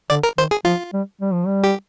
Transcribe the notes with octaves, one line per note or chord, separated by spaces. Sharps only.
D3 D5
A#4
D#3 C5
G#4
F3 F4
G3
G3
F3
G3
G4